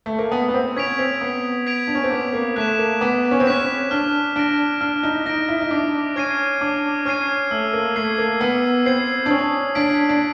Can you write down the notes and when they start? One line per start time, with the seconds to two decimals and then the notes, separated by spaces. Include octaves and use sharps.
0.06 A3
0.19 A#3
0.31 B3 D#6
0.49 B3
0.54 C4
0.76 C#4 G#6 B6 D7 F7
0.99 C4
1.21 B3 D#6
1.66 G#6 B6 D7 F7
1.87 D4
1.95 C#4
2.04 C4
2.11 B3 D6
2.33 A#3
2.56 A3 F#6 B6 E7
2.79 A#3
3.01 B3 D6
3.31 C#4
3.40 C4
3.46 C#4 F#6 B6 E7
3.91 D4 F6
4.36 D4 A#6 D7
4.81 D4 F6
5.03 D#4
5.26 D#4 A#6 D7
5.49 E4
5.61 D#4
5.71 D4 D6
6.16 C#4 F6 G#6 C7 D#7
6.61 D4 D6
7.05 C#4 F6 G#6 C7 D#7
7.51 A3 E6
7.73 A#3
7.96 A3 G#6 C7
8.18 A#3
8.41 B3 E6
8.86 C4 G#6 C7
9.26 D4
9.30 C#4 D#6
9.75 D4 G#6 B6 D7
10.09 D4